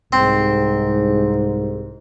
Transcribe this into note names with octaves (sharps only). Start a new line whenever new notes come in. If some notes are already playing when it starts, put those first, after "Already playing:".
C2 G#2 C4